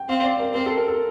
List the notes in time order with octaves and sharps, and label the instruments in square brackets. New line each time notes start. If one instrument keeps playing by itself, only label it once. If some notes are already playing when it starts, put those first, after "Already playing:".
Already playing: [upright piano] G5
[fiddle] C4 [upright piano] F5
[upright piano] D5
A#4
[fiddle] C4 [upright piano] A#4
[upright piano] A4
A#4
A4